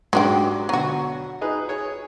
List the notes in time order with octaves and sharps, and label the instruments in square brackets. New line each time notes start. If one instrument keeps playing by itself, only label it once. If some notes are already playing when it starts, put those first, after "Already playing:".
[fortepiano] G#2 F#3 [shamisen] G#3 D4 G4
[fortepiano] B2 D3 [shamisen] F#3 F#4
[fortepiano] D#4 G#4 B4
G#4 C#5